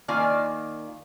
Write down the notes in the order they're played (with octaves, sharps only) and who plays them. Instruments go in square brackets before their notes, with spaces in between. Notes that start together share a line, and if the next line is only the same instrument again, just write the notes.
[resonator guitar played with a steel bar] D#3 A#3 F4 D5 G#5